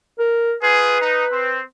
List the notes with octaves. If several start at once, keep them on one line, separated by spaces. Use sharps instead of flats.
A#4
F4 G#4 B4
D#4
C4